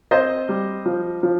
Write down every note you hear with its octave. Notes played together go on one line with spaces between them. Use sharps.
C4 C5 D#5
G3
F3
F3